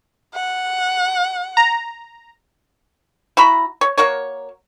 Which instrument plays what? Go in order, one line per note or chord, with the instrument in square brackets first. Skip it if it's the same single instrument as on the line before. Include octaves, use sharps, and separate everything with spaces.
[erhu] F#5
[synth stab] A#5
[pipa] E4 F#4 A#5 B5
C#5
A#3 F#4 A#4 C#5